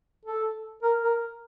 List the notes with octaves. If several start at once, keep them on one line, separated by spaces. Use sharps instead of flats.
A4
A#4
A#4